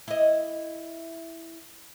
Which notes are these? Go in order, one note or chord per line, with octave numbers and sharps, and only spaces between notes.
E4 D#5